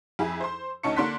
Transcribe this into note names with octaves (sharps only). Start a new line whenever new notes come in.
F2 E4 G#4 B5
C5 C6
D2 C#4 D#4 A5 C#6 C#7
D3 A#3 D4 C6 F#6 B6